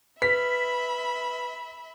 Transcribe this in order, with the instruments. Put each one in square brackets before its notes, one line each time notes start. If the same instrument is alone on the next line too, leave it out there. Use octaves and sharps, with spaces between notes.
[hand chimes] B4 [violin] E5 B5 [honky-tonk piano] B6